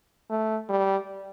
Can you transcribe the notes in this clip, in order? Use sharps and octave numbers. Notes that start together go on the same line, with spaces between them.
A3
G3